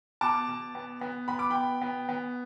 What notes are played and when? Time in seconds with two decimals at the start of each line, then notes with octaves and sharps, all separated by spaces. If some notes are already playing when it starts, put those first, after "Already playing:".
0.21 B2 A5 D6
0.48 B2
0.75 B3
1.01 B3
1.28 B3 B5
1.39 D6
1.50 B2 G5 B5
1.82 B3
2.09 B3